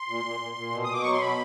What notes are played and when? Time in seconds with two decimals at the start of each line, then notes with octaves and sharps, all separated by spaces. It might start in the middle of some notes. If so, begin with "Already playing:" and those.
Already playing: C6
0.08 A#2
0.24 A#2
0.40 A#2
0.57 A#2
0.72 B2
0.84 D#6
0.89 B2 D6
1.02 F#3 C#6
1.12 C6
1.21 B2 B5